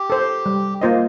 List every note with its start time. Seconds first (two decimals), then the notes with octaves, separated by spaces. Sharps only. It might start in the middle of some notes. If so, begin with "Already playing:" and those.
Already playing: G4
0.10 A4 C5
0.46 G3
0.81 A#3 F4 C5 D#5